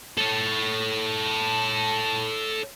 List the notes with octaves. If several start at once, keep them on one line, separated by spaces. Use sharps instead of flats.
A4 C#5